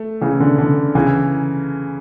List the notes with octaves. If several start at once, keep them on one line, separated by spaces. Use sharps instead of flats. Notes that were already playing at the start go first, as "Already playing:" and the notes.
Already playing: A3
C#3 E3
D3
D3
C#3 E3